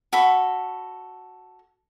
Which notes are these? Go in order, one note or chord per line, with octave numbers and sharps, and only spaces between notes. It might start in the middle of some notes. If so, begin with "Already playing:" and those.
F#4 A4 B5